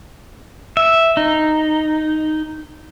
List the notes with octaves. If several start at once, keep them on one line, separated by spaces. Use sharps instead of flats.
E5
D#4